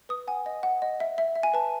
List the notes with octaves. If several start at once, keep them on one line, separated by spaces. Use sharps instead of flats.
B4 D#6
F#5 G#5
D#5
F#5
D#5
E5
E5
E5
G#5
B4 A5